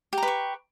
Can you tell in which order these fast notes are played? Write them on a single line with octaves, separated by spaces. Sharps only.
G4 A#5 B4 C#6